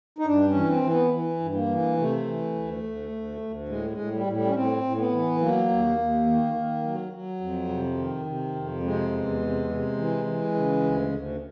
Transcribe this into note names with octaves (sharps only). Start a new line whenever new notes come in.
D#4
G2 D4
C#4
E3
C4
E3
B3
E3
G2
A#3
E3
C3 A3
E3
D2
D2
D2
D2
A2 G#3
G#3
A2
G3
A2
G3
C#4
A2 C4
A2
B3
E3
F#3 A#3
D#2
D#2
D#3
D#3
F#3
F#3
F2
C3
D#3
C3
F2
C3 G#3
E2
C3
C3
E3
E3
C#3
D2
D2